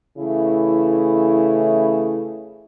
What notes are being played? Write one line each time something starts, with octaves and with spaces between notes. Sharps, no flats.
C#3 E3 A3 E4